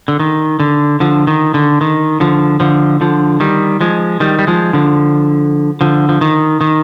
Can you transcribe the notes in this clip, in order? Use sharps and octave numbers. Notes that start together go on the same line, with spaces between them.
D3
D#3
D3
D3 F3
D#3
D3
D#3
D3 F3
D3 F3
D3 F3
D#3 G3
F3 G#3
D#3 G3
G3
F3 G#3
D3 F3
D3 F3
F3
D#3
D#3